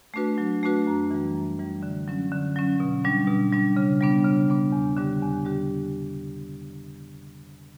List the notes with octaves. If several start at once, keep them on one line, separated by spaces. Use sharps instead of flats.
A3 D4 F#4 B4
F#3
A3 D4 F#4 B4
F#2
E3 G3
F#2
E3 G3
D3
F#3 C#4
D3
F#3 C#4
B2
G3 D4
B2
G3 D4
C#3
G3 B3 D4
C#3
G3 B3 D4
E2
D3 G3 D4 G4
E2
D3 G3 D4 G4